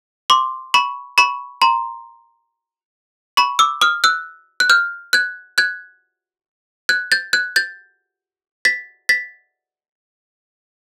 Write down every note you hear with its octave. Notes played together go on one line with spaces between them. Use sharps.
C6 D6
B5 C#6
B5 C#6
A#5 C6
B5 C#6
D6 E6
D#6 F6
E6 F#6
F#6
F6 G6
F#6 G#6
F#6 G#6
F#6 G#6
G6 A6
F#6 G#6
G6 A6
A6 B6
A6 B6